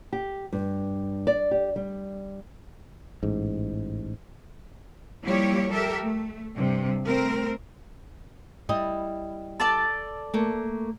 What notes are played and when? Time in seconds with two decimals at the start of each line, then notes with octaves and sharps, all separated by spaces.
0.13 G4
0.53 G2
1.27 D5
1.51 G4
1.76 G3
3.23 A1 G#2
5.22 F3 G3 A#3 E4 G4 C#5
5.70 G4 A4 A#4 E5
6.01 A3
6.54 G2 C3
7.05 A3 C4 A#4
8.69 G3 E4 D#5
9.60 A4 D5 A5
10.34 A3 A#3